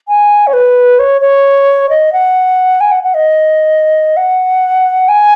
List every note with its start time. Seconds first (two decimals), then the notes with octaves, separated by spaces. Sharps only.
0.08 G#5
0.47 C#5
0.53 B4
0.99 C#5
1.21 C#5
1.89 D#5
2.13 F#5
2.81 G#5
2.92 F#5
3.03 F#5
3.14 D#5
4.17 F#5
5.09 G#5